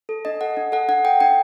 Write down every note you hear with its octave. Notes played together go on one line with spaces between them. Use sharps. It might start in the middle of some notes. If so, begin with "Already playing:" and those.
A4
D4 D#5
A4 F#5
D4
A4 F#5
D4 F#5
A4 G5
D4 G5